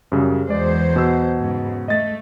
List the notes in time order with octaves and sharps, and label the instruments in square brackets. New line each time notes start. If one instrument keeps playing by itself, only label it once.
[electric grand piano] F#2 C#3 G3
[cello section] E2 F#3 C5 [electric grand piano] G#3 D5
[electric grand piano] B2 E6
[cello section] G#2 C#3
[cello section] A3 [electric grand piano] D#5 A6